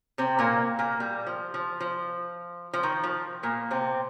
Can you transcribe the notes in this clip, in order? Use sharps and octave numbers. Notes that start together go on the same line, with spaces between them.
C3 C4
A#2 A#3
A#2 A#3
G3
F3
F3
F3
F3
D#3
F3
A#2 A#3
C3 C4